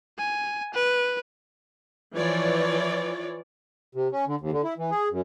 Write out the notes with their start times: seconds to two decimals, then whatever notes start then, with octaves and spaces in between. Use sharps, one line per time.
0.18 G#5
0.74 B4
2.17 E3 F3 C#5 D5
3.95 C3
4.12 C#4
4.27 D3
4.41 D#2
4.52 D3
4.64 E4
4.78 E3
4.91 G#4
5.11 F#2